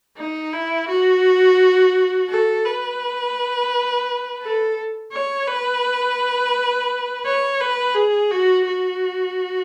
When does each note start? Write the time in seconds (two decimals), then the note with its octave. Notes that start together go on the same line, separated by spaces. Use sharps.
0.17 D#4
0.53 E4
0.88 F#4
2.29 A4
2.65 B4
4.42 A4
5.13 C#5
5.48 B4
7.25 C#5
7.60 B4
7.95 G#4
8.31 F#4
8.66 F#4